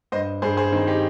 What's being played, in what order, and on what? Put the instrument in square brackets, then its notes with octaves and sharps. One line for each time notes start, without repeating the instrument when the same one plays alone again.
[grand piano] G2 C5 D#5
G2 G#4 C5
G#4 C5
D#3 C4 D#4
D#4 G4